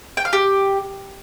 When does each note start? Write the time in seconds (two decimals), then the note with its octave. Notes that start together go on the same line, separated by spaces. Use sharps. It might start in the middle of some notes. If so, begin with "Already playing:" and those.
0.17 G5
0.25 F5
0.33 G4